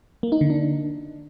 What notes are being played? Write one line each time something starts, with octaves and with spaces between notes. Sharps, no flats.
A#3
D#4
D3
D4